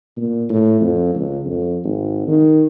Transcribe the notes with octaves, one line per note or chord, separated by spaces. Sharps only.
A#2
A2
F2
C#2
F2
G#1
D#3